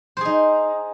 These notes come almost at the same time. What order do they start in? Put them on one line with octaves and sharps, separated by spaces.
C5 G#4 D#4